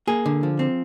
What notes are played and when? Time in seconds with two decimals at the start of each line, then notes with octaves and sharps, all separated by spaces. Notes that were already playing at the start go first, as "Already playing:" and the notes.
0.07 A#3 G#4
0.26 D3
0.43 F3
0.59 C4